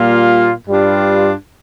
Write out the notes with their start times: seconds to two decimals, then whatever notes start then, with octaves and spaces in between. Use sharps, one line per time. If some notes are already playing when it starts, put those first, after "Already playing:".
Already playing: A#2 G3 A#3 F4
0.68 G2 G3 D4 F4